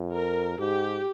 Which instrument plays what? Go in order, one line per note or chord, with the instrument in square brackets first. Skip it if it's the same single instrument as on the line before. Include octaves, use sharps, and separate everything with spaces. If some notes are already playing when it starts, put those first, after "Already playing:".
Already playing: [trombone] F2
[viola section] A#4
[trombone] G#2 [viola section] G4